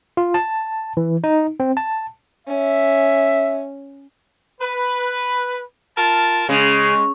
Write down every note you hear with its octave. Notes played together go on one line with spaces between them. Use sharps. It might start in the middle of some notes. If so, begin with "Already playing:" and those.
F4
A5
E3
D#4
C4
A5
C#4 E5
B4
F4 A#4 A5
C#3 G#3